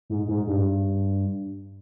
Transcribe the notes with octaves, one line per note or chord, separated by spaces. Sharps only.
G#2
G#2
G2